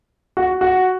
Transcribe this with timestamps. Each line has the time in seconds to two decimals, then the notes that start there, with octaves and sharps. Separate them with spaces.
0.37 F#4
0.61 F#4